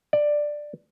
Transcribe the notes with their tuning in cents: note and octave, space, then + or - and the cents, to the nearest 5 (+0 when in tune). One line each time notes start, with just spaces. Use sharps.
D5 +10